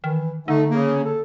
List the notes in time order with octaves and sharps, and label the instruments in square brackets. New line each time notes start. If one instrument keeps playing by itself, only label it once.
[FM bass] D#3 [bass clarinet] E3
[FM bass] D3 [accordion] A3 [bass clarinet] D#4
[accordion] C#3 [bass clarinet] A#3
[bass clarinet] A4